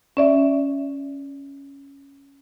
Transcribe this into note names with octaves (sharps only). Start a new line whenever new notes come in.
C#4 D5 E5